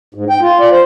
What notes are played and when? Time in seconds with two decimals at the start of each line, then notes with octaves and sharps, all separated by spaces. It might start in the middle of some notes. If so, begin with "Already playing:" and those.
0.15 G#2
0.30 G5
0.41 F4
0.60 D5
0.72 C5